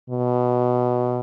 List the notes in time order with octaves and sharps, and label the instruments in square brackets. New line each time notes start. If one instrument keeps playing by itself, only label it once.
[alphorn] B2